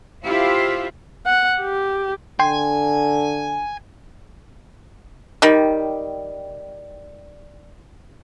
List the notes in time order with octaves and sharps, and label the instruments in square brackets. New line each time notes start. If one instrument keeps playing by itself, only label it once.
[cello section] E4 F4 G4 C5 E5 F5
[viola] F#5
G4
[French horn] D3 [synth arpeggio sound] G5 C6 [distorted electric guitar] G#5
[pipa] D#3 G3